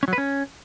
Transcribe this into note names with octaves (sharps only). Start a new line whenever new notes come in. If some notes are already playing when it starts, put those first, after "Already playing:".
C#4
F#3
B4
C#4